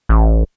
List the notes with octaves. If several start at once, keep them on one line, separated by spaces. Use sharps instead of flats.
A1